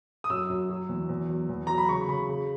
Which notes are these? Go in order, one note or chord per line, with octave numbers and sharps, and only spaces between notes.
D#6
F#2 E6
F#2
F#3
E2
E2
F#3
E2
F#3 A#5
B5
C#3 C#6
C#3 B5
C#3